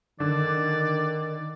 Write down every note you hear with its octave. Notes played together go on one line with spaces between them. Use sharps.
D3 D#3 D5